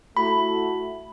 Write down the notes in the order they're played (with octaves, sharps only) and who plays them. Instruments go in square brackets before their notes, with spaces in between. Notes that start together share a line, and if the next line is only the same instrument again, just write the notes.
[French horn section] A3 E4 F#4 [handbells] B5